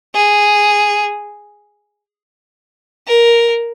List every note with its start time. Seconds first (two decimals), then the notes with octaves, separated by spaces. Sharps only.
0.15 G#4
3.07 A#4